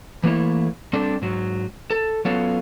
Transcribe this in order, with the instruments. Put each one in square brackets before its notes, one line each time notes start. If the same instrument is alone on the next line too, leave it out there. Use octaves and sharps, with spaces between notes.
[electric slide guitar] E3 A3 A#3 E4 C#5
G3 C4 D4 A4
G#2 F#3
A4
F#3 B3 C#4 F4 A4 C#5